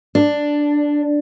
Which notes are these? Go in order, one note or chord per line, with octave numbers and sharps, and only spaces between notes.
D4